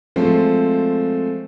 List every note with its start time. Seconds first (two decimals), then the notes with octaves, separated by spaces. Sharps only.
0.16 F3 G#3 A3 C4